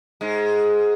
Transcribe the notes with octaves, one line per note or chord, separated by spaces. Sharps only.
G#2 G#3